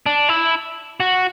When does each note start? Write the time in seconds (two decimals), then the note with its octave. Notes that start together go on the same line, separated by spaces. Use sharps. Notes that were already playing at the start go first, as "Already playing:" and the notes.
0.06 D4
0.29 E4
1.00 F#4